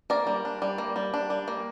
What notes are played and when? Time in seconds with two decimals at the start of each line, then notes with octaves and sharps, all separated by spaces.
0.10 A#3 A#4 D5
0.27 G3
0.45 D4
0.62 G3
0.78 A#3
0.96 G3
1.14 D4
1.30 G3
1.48 A#3